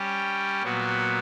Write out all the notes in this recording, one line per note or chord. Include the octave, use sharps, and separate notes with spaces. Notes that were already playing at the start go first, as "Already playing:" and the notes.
Already playing: G3 C#4 G4
A#2 F#3 B3 F#4